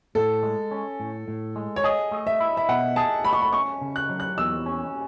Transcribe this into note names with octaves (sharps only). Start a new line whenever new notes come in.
A2 A4
G#3
C#4
A2
A2
G#3
C#5
G#4 D#5
A3
E5
E4
E5
B2 F#5
G#4 A5
A3 B5
C#6
B5
C#4 C#6
C#3
F#6
F#3
F#6
E2 E6
C#4